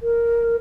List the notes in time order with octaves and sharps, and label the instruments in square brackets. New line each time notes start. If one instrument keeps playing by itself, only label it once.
[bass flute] A#4